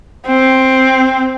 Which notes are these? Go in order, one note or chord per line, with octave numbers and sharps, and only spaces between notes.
C4